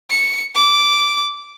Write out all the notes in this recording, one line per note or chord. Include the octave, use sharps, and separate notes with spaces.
C#7
D6